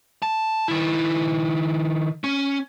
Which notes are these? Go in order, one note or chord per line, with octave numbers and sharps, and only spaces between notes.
A5
D#3 E4
C#4